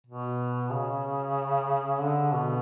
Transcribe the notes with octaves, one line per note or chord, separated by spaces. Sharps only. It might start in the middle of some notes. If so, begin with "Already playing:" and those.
B2
C#3
D3
B2